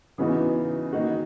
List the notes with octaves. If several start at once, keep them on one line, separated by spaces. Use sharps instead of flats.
C#3 E3 B3 D#4 F#4
D#3 A#3 D#4 F#4